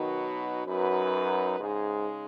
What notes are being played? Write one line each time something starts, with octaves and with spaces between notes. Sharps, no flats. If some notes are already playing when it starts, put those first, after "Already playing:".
Already playing: B2 D#3 F#3 D#4 F#4 B4
F#2 F#3 D#4 F#4 B4
G#2 C#3 G#3 D#4 G#4